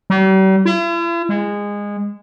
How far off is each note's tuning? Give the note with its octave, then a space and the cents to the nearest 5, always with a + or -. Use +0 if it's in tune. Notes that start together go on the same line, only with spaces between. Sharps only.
G3 -45
E4 +45
G#3 -20